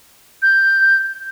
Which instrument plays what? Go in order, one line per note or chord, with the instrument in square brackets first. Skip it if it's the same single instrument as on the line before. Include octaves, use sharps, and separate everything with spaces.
[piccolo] G6